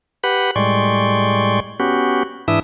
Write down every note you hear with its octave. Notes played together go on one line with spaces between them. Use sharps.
G4 B4 F#5 B5
A2 G3 G#3 D5 C6 C#6
B3 C#4 F#4 G4
G#2 E3 D4 E4 E5 D#6